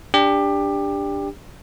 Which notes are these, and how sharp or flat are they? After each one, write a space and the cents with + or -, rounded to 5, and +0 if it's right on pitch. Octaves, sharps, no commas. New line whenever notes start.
D4 -5 G4 +20